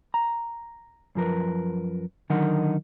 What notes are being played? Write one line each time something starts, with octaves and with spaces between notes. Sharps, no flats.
A#5
F#2 F3 A#4 B4
D3 D#3 F#3 D#4 A#4 F#5